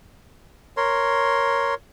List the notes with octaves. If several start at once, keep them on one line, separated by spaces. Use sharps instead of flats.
A#4 C#5 C6